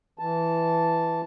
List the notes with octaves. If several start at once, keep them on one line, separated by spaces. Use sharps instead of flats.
E3 A5